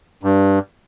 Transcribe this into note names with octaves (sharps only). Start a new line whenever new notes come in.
G2